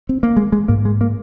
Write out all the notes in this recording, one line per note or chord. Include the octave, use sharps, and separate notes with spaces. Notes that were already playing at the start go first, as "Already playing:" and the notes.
C4
A#3
G#3
G#3
G#2 A#3
G#3
A#3